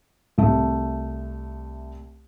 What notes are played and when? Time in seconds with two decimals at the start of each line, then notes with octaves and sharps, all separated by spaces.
0.38 C2 A3